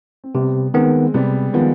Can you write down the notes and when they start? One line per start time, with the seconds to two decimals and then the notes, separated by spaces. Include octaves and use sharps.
0.24 C4
0.35 C3 G3 B3
0.74 D#3 G#3 B3 C4
1.14 C3 G3 B3
1.54 D#3 F3 G#3 B3